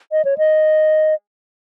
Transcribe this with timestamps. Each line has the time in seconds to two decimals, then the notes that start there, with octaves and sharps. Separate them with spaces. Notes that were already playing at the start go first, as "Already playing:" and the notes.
0.12 D#5
0.25 C#5
0.38 D#5